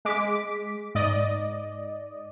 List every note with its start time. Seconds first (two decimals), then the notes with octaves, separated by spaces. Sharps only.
0.05 G#3 D6 B6
0.95 G#2 D5 D#5